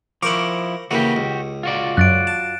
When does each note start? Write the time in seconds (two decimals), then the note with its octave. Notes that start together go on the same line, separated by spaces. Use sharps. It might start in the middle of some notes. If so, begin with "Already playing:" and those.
0.22 F3 E4 A#4 C5 F#5 C#6 D6
0.91 C#3 E3 A#3 F#4 G4
1.16 C#2
1.63 F4 F#4 D5
1.97 F#2 F#6 A6 D7
2.27 A5